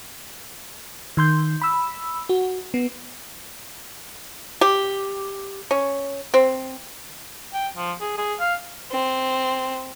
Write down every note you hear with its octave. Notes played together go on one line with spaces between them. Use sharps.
D#3 C6 G6
B5 E6
F#4
B3
G4
C#4
C4
G5
F3
G#4
G#4
F5
C4